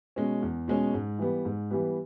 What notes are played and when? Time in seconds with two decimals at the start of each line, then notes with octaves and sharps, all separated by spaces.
0.16 B2 G#3 C#4
0.42 E2
0.68 B2 G#3 C#4
0.94 G#2
1.19 E3 G3 B3 G4
1.45 G#2
1.71 E3 G3 B3 G4